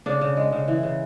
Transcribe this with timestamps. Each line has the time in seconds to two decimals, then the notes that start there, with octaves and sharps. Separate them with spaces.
0.06 C#3 D4
0.21 C#3
0.37 G#3
0.52 C#3
0.68 E3
0.83 C#3